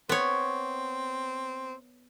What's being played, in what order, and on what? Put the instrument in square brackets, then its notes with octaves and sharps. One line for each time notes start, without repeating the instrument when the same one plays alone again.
[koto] B3 C#5 [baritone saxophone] C4